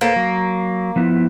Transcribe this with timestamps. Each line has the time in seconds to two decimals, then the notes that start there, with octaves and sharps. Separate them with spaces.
0.01 A#3 A4 B4 C5
0.16 F#3
0.96 F3 B3 E4